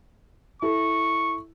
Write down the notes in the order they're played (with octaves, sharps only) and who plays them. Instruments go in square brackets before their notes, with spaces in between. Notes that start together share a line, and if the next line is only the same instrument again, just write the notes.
[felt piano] E4 A4 [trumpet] C#6